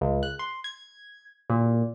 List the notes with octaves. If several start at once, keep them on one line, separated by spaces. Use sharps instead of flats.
C#2
F#6
C6
G#6
A#2